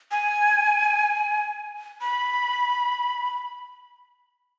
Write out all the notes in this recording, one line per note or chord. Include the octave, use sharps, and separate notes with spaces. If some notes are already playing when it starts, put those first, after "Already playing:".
G#5
B5